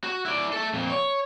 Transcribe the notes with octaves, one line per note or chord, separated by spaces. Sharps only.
F#4
E4 D5
A4 E5
F2 A#2
C#5